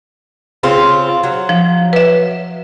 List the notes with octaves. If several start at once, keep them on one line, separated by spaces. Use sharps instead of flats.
C#3 C4 F4
F#3
F3
B4 E5